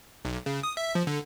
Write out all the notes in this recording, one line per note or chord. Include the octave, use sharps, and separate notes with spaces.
B1
C#3
D#6
E5
F3
D3